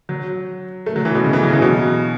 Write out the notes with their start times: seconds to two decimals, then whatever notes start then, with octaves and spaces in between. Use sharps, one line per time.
0.09 F#3
0.86 A3
0.96 F#3
1.05 E3
1.15 B2
1.24 C#3
1.33 E3
1.43 F#3
1.49 C#3
1.53 E3
1.62 B2